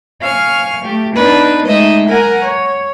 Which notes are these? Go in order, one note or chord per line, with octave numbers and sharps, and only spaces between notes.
F5 G#5 C#6 F6
A3 G4
B3 D4 D#4 B4
G#3 A3 D#4 D#5 E5
A#4 F#5 G#5 A#5
C#5